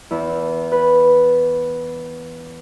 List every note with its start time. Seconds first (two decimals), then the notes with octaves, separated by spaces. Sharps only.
0.11 E2 E4
0.72 B4